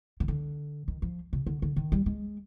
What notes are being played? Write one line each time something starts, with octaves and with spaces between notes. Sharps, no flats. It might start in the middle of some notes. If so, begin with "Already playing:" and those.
D#3
D3
D#3
F3
C3
D3
D3
D#3
G3
G#3